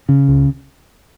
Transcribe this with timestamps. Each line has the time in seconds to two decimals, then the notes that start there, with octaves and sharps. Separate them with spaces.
0.09 C#3
0.28 C#2